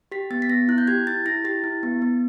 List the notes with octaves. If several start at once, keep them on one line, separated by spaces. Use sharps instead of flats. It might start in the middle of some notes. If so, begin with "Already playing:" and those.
G4 B6
B3 A6
B6
B3 A#6
E4 F#6
G6
G4 G#6
E4 A6
E4 A#6
G4 A6
E4
B3
B3